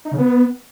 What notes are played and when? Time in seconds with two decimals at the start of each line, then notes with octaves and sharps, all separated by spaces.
0.05 D#4
0.11 C#3
0.18 B3